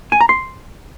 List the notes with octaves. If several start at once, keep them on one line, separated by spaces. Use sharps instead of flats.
G#5
A#5
C6